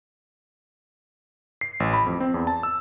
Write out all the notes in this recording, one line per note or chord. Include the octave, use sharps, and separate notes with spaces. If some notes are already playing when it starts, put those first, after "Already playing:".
C7
A1
B5
F2
C4
E2
A5
E6